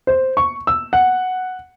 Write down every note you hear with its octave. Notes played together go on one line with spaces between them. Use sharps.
C5
C#6
E6
F#5